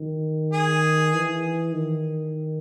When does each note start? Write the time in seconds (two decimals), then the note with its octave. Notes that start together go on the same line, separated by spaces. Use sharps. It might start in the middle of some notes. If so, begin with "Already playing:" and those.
Already playing: D#3
0.53 G#4
1.13 E3
1.72 D#3